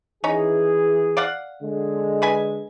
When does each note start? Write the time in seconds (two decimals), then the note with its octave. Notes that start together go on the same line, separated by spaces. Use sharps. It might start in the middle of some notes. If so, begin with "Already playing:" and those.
0.24 E3 C#4 D#4 G#4
1.17 D5 F5 F#5
1.62 D3 G#3
2.22 G#4 B4 G#5